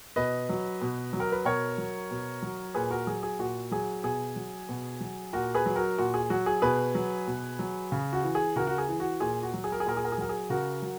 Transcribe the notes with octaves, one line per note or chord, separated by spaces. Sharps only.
B2 B4 D#5
F#3
B2
F#3
A#4
B4
B2 A#4 C#5
F#3
B2
F#3
A#2 G#4 B4
F#4 A#4
F#3 G#4
G#4
A#2 F#4
F#3 G#4
B2 G#4
F#3
B2
F#3
A#2 F#4 A#4
G#4 B4
F#3
F#4 A#4
A#2 F#4
G#4
F#3 F#4
G#4
B2 G#4 B4
F#3
B2
F#3
C#3
F#4
E3
G#4
C#3 F#4 A#4
F#4
G#4
E3
F#4
A#2 G#4
F#4
F#3
G#4
A#4
G#4
A#2 A#4
G#4
A#4
G#4
F#3 A#4
G#4
C#3 F#4 A#4
F#3